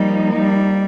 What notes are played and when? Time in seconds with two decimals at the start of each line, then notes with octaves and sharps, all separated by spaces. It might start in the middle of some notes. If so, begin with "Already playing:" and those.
Already playing: F3 G3 A#3 D#4
0.35 G3